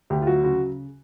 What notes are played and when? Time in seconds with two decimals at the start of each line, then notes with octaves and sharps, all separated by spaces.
0.10 D2 G4
0.22 F4
0.27 F#3 F#4
0.44 C#3 F#4